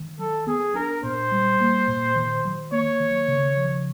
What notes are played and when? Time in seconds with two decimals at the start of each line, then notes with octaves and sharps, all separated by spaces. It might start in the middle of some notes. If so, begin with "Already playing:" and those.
Already playing: D#3
0.19 F#3 A4
0.47 B3 G#4
0.75 D4 A#4
1.03 A#2 C5
1.32 G3
1.61 A#3
1.88 A#2
2.16 D#3
2.45 F#3
2.72 A#3 C#5
3.00 D#3
3.28 C#3
3.57 F3